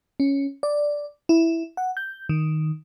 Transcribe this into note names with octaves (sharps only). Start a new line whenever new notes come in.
C#4
D5
E4
F#5
G6
D#3